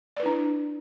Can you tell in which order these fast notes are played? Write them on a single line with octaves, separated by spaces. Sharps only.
D5 B4 E4 D4